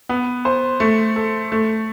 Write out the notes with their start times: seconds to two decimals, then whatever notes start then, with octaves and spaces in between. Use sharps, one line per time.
0.09 B3
0.45 C5
0.80 A3
1.16 A4
1.52 A3